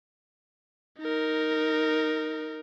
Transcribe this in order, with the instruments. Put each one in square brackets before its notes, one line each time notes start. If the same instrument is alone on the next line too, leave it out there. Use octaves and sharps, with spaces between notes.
[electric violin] D#4 A#4